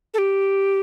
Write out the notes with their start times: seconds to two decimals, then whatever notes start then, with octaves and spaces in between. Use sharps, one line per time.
0.14 A4
0.18 G4